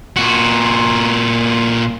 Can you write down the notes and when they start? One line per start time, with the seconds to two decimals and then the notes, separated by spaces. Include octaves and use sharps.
0.16 A#2 F#4